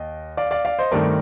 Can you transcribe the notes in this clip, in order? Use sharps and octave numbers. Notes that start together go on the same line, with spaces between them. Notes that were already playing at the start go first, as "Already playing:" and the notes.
Already playing: D#2 D#5
D5 F5
D5 F5
D5 F5
C5 D#5
G2 D#3 A3 C4 A#4 D5